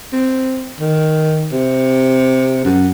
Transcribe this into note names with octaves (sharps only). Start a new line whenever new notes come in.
C4
D#3
C3
F#2